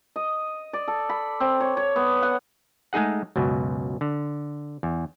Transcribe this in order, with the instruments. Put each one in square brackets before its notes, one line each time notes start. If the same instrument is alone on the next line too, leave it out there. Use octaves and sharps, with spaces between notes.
[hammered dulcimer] D#5
D5
A4
B5
C4
C#5
C#5
B3
F#5
[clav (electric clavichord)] G#3 A3 D#4 G#4 F#5
C#2 F#2 B2
D3
E2